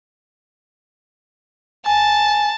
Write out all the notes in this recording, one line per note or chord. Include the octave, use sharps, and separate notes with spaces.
G#5 A5